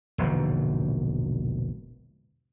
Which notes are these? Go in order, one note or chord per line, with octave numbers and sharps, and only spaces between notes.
E1 A#1 G#2 D3